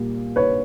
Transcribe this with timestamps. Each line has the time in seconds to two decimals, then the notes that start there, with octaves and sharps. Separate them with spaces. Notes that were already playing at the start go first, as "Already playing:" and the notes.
Already playing: A#2 G3 A#3
0.36 B4 C#5